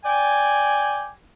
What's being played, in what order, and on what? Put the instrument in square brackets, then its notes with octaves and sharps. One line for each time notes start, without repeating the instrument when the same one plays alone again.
[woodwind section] D5 G5 G#5